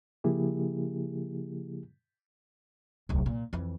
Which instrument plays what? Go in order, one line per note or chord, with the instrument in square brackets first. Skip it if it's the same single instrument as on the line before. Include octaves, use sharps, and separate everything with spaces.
[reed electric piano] C#3 F3 A#3 E4 G4 G#4
[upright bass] D1 C2
A#2
F2 E3